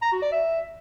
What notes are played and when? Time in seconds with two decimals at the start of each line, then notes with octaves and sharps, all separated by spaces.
0.02 A#5
0.12 F#4
0.22 D5
0.32 E5